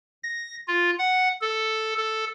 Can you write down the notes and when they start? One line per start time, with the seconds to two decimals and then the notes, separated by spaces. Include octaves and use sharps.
0.23 A#6
0.68 F4
0.98 F#5
1.41 A4
1.97 A4